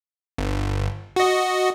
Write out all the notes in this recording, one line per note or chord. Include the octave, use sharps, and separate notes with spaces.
G1
F#4 D#5